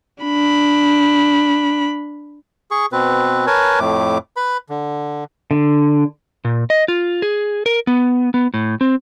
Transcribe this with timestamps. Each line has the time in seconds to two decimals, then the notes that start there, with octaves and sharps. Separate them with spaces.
0.24 D4 B5
2.71 G#4 C#6
2.92 B2 C4 B4
3.47 A#4 B4 C#5 G#5 A5
3.80 F2 A2 A3 D6
4.37 B4 B5
4.69 D3
5.51 D3
6.45 A#2
6.70 D#5
6.88 F4
7.22 G#4
7.66 A#4
7.87 B3
8.34 B3
8.54 A2
8.81 C4